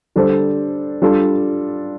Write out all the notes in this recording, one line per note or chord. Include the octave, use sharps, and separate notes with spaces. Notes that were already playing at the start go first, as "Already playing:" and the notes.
D3 G3 D4 A4 C5
G3 D4 F4 A4